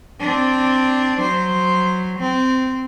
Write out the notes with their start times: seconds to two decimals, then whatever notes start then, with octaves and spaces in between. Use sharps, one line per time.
0.20 C4 D4
1.20 F#3 C5
2.20 C4